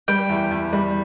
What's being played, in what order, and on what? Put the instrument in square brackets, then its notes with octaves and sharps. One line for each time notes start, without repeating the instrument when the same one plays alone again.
[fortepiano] G3 [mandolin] G5
[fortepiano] E2
E2
G3